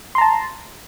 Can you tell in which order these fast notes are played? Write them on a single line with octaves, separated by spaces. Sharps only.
C6 A#5 A5